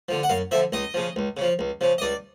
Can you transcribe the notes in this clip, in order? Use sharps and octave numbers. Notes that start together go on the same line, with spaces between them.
D3 F3
F#5
F#2 F5
D3 F3 E5
C#2 D#5
C#3 F3
C#2
C#3 F3
C#2
C#3 F3
D#5
C#2 D5